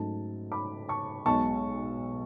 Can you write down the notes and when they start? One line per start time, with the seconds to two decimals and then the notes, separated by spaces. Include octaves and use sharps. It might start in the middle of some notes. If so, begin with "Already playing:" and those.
Already playing: G#2 F#3 A3 C#4 A5
0.52 B5 D6
0.89 A5 C#6
1.26 B1 B2 G#3 A5 C#6